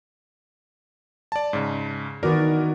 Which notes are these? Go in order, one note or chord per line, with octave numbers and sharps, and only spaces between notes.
D5 A5
G#2 C#3
D#3 E3 B3 F#4 A#4 D5